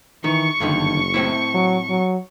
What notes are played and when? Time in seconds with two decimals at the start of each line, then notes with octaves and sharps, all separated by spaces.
0.24 D#3 E3 C#6 C#7
0.60 F#1 G2 D3 D#3
1.14 A2 C4 E4
1.54 F#3
1.90 F#3